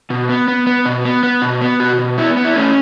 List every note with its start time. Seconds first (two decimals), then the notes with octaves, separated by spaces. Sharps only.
0.10 B2
0.29 B3
0.48 B3
0.67 B3
0.86 B2
1.05 B3
1.23 B3
1.42 B2
1.61 B3
1.80 B2 F#4
1.99 B2
2.18 B3 E4
2.37 B3
2.44 E4
2.56 A3 C#4